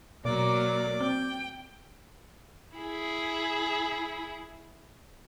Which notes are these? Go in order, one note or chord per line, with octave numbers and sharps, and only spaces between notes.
B2 F#3 A#3 D5 D6
C4 G5
E4 G#4